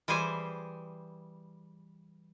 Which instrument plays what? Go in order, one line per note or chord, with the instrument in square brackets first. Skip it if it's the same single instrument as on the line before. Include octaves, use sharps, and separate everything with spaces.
[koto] E3 G3 G#4 C5 G#5